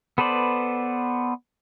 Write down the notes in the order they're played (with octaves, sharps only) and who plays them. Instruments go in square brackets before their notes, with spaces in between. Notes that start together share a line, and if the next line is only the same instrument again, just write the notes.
[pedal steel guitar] B3 A4 B4 C5 D5